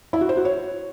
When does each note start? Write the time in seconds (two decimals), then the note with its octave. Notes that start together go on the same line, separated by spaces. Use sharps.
0.13 E4
0.21 F#4
0.29 C5
0.37 F#4
0.45 C#5